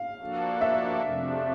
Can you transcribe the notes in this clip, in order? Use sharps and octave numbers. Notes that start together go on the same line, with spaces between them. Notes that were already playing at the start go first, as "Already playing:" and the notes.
Already playing: F5
F3 A#3 D4 F#4 A4
E5
F2 C3 F3 A3 D4